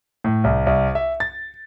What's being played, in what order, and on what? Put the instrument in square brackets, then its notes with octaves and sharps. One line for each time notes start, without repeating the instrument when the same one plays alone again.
[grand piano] A2
C2
C2
E5
A6